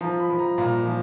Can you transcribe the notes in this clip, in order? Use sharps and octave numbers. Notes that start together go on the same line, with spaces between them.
F3 A#5
B5
F3
A#5
A#2 A#5
F3